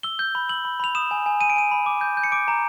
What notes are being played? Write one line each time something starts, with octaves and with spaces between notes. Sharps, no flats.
E6 G7
G6
B5
E6 F#7
B5
B5 F7
D#6 E7
G#5
G#5
G#5 D#7
D7
G#5 D#7
B5
D6
G6
G6
C#7
D6 D7
A#5